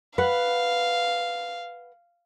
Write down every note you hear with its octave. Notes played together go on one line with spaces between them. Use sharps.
B4 F5 F#5